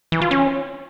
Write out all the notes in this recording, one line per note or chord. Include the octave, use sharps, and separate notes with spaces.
E3
F4
C#4